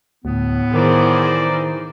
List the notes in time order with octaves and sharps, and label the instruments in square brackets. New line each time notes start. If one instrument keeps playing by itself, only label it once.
[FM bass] D2 [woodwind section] A2 B3
[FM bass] D#3 [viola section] E3 G#4 C5 [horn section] A#4 D5